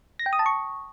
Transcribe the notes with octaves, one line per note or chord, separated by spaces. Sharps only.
A#6
G5
D#6
A5
C#6